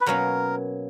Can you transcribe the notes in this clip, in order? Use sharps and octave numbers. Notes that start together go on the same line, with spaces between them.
B4
B2 F#3 A#3 C#4 A#4